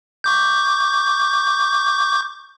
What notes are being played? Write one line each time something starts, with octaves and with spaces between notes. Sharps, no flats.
C#6 D6 G6